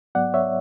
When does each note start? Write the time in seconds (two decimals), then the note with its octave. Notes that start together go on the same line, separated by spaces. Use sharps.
0.15 G#2 F#3 B3 D5 F#5
0.34 C#5 E5